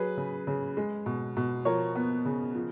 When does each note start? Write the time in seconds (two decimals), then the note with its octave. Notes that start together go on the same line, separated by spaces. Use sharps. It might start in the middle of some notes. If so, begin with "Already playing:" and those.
Already playing: F#3 G#4 B4
0.17 C#3
0.47 C#3
0.77 G#3
1.06 B2
1.37 B2
1.65 F3 A#4 C#5
1.95 B3
2.25 C#3
2.55 F3